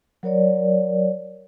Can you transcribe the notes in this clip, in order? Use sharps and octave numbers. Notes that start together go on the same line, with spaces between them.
F#3 A#4 C#5 D5